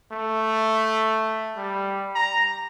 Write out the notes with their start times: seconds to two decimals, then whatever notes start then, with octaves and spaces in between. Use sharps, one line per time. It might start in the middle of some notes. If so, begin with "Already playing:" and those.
0.12 A3
1.57 G3
2.15 A#5